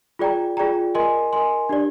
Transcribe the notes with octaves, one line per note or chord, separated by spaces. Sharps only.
F4 G#4 D5 G5 A#5
F4 G#4 D5 G5 A#5
A#4 D#5 G#5 C6
A#4 D#5 G#5 C6
D4 G4 D5